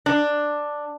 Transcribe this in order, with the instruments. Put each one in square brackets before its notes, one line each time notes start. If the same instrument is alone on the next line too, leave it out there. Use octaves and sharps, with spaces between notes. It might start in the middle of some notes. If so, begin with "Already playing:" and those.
[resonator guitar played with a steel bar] D4